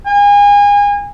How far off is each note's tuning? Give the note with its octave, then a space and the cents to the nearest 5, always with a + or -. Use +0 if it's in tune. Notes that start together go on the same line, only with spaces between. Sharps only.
G#5 -30